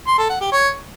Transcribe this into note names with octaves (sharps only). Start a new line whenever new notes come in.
C6
A4
F#5
G4
C#5